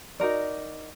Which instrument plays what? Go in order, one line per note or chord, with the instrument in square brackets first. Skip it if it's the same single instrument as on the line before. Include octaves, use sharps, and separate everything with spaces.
[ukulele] D#4 F#4 A#4 D5